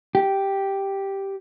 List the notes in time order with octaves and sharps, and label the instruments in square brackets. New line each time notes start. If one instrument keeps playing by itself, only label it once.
[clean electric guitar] G4